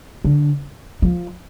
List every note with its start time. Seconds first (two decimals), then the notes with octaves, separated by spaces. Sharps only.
0.24 D3
1.02 F3